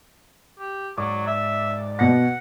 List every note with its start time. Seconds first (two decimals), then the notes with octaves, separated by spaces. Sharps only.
0.59 G4
0.98 G#2 F#3 D5 D6
1.27 E5
1.99 B2 F#5 A#6